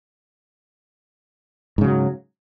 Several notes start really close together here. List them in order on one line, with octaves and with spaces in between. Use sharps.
G#2 C#3 F#3